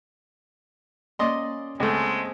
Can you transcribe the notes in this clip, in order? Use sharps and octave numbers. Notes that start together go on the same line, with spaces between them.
A#3 C#4 D5 D#5 C6
C#2 G#3 A3 C4 G#4 C5